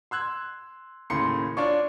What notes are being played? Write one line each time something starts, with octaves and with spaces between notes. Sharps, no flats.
C6 E6 F#6 G#6
D#2 A2 C#3 C6 C#7
D4 F4 C#5 D5 C#6